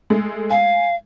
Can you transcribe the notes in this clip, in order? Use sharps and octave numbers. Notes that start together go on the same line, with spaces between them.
G#3 A3
F5 G#5